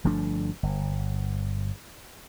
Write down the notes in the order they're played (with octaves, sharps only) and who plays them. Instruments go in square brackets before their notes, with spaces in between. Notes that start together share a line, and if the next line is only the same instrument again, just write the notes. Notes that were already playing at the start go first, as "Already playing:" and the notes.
[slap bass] G1 F3 A3 D4
G1